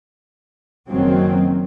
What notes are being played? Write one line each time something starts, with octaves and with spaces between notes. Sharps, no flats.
F#1 F#2 D#3 F#3 C4